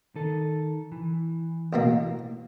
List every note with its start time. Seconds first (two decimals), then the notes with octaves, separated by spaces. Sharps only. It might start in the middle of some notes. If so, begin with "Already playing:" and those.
0.16 D#3 A4
0.92 E3
1.73 A1 B2 A#3